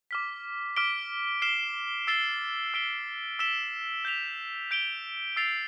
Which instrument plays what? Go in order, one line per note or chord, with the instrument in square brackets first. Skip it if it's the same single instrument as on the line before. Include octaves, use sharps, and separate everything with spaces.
[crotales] D6 F6 B6
D6 F6 B6 D7 G7
F6 C7 E7 G7
E6 A6 C7 E7 G7
E6 B6 D7 G7
E6 B6 E7 G7
G6 B6 F7
G6 D7 G7
E6 A6 C7 F7